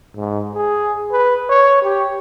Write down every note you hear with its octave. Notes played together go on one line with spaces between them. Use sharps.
G#2
G#4
B4
C#5
G4